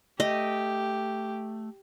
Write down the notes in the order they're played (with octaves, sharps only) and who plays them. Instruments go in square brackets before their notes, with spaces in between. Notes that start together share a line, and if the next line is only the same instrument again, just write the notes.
[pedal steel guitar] A3 [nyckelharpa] G4 [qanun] D#5